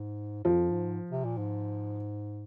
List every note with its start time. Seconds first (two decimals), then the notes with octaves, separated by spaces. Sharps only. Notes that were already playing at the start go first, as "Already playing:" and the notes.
Already playing: G#2
0.44 F2 F3
0.71 G#2
1.11 C3
1.24 A#2
1.38 G#2